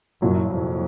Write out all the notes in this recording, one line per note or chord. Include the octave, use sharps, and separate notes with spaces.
C2 F#2 A#2 F#3
F2